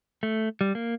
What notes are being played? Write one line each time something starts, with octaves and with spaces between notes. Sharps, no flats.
A3
G3
A#3